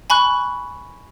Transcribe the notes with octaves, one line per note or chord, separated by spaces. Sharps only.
G#5 B5 C#6 F#6